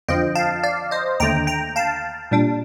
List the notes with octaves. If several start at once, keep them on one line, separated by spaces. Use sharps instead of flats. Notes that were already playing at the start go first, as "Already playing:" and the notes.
F2 D3 F3 D#5 G5
F5 A5
D5 F5
C5 D#5
D#2 D3 A3 G5 A#5
G5 A#5
F5 A5
A#2 G3 D4